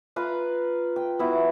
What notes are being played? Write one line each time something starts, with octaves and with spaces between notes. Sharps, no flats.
F4 B4 F5 A#5
G5
B3 E4 F#4